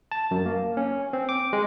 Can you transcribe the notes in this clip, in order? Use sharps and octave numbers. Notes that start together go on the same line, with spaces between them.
A5
F#2
A#3
C#4
C4
D6
G#3